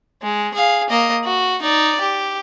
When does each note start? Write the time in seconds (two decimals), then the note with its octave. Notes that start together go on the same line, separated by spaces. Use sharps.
0.22 G#3
0.54 G#4 F5
0.90 A#3 D#5
1.24 F#4
1.62 D#4 D5
2.01 G4